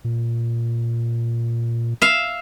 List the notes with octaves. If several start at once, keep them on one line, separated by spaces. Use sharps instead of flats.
A#2
E5 F5